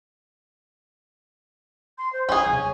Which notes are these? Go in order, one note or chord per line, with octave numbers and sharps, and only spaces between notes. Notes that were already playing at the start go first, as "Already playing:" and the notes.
C6
C5
C#4 D4 G#4 G#5
D#1 C3